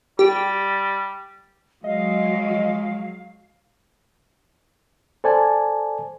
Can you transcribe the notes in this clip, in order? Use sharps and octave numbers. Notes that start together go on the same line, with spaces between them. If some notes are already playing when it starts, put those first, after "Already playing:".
G3 G4
F#3 G#3 D#5 F5
A4 C5 D5 G#5 A5